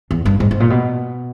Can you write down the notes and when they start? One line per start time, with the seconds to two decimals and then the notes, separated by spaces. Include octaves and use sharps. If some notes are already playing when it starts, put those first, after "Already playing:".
0.11 E2
0.25 G2
0.40 G#2
0.51 G#2
0.60 A#2
0.70 B2